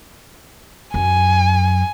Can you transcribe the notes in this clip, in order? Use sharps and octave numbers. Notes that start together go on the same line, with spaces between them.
F#2 G#5